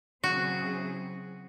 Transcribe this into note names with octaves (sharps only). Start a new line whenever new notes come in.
C#3 F#3 C4 E4 F#4 G#4